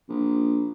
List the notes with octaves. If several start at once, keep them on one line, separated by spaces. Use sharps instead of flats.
A#1